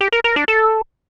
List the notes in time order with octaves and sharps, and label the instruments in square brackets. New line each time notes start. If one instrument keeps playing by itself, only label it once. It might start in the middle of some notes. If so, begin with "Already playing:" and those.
[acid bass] G4
A#4
A#4
D4
A4